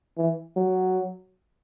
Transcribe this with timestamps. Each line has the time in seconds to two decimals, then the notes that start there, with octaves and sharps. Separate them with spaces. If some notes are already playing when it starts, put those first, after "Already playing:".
0.17 E3
0.56 F#3